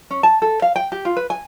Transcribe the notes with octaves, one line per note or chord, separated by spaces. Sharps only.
C#4
A5
A4
F5
G5
G4
F4
B4
G#5